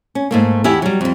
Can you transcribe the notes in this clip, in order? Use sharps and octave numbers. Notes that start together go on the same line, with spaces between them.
C#4
G#2 A3 A#3
E2 E4 G4 G#5
F#3 G3
F2 G3